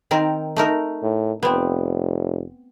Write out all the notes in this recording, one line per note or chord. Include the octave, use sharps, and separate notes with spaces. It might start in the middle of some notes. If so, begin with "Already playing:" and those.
D#3 C4 A#4
A3 D#4 A#4
A2
F1 B3 C4